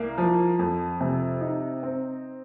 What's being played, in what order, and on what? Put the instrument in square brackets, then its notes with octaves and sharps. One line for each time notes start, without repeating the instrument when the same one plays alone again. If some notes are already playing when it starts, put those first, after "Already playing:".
Already playing: [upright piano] C2 A#3
F3
F2
C3
D#4
C4